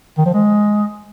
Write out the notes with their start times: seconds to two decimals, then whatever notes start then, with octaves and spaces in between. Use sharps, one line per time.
0.18 D#3
0.26 F3
0.34 G#3